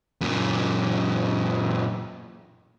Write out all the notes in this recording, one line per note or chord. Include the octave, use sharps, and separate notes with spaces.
F#2 A#2